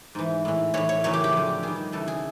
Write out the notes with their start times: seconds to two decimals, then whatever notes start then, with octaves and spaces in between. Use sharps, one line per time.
0.15 G#2 E3
0.45 A2 E3
0.74 A2 E3 C#5
0.89 C#5
1.04 F#2 C#3 E3 C#5
1.13 G4
1.24 G4
1.33 F2 D3
1.63 G2 D#3 G#4
1.92 E2 C#3 E3 A4
2.08 G#4